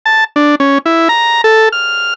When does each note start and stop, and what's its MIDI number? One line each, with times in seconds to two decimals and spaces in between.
0.06 0.24 81
0.36 0.55 62
0.60 0.78 61
0.86 1.08 64
1.09 1.41 82
1.44 1.69 69
1.72 2.14 89